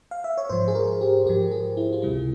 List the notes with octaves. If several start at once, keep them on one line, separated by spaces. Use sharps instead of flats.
F5
E5
C#5
G#2 F3 C5
G#4
A#4
G4
G#2 F3 G4
G#4
E4
F4
C#2 C3 G3 E4